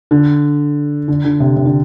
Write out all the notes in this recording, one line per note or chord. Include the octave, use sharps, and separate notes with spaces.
D3
D3
D3
C3
C3
D3